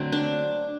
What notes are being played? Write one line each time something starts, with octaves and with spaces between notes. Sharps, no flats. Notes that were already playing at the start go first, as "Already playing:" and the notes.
Already playing: D3 F#3 A3 C4
D4